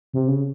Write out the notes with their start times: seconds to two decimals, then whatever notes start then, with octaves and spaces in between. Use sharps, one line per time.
0.14 C3
0.28 C#3